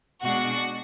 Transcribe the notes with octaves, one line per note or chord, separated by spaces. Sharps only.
B2 G#3 D4 F#4 F#5